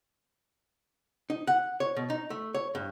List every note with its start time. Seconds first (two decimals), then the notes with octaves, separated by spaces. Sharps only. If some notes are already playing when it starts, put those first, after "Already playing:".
1.30 D#4
1.47 F#5
1.80 C#5
1.96 B2
2.10 D#4
2.30 A3
2.54 C#5
2.75 G2